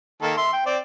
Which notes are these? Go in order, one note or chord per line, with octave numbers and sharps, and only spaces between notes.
D#3 A#3 A4
E5 C6
G5
C4 D5